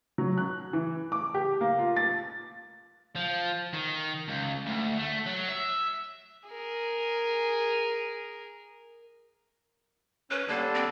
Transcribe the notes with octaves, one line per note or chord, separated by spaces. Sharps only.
F#3
F#6
E3
D6
G4
A#3
F4
A6
F3
D#3
C#2
D2
A3
F#3
E5
G#4 A#4
C#4 B4
D3 G3 A#3 D4
C4